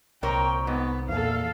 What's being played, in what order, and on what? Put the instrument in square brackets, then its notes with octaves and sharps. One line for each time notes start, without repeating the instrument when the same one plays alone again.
[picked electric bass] C2 [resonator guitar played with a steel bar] A#2 A#4 C#5 [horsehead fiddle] G5
[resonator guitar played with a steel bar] G#2 [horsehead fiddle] B3
[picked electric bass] E2 A#2 [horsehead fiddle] A4 F5